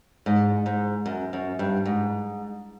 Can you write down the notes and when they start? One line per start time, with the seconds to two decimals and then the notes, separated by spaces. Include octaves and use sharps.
0.26 G#2
0.66 G#2
1.06 F#2
1.33 F#2
1.59 G2
1.85 G#2